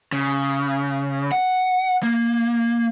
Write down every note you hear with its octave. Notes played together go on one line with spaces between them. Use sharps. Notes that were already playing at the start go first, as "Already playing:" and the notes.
C#3
F#5
A#3